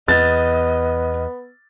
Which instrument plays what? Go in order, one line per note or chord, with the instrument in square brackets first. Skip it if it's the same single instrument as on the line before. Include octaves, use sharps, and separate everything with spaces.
[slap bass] E2 [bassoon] B3 [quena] D#5 [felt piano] A6